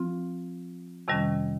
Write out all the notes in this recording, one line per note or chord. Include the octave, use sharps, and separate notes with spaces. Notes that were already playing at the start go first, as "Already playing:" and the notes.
Already playing: F3 C4 F4
F2 C3 D#3 G3 C#4